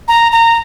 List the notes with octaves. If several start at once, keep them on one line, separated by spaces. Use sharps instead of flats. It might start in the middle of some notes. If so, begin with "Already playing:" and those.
A#5
A#5